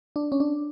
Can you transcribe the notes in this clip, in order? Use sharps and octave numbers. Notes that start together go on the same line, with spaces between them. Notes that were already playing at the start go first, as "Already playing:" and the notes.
D4
C#4
D4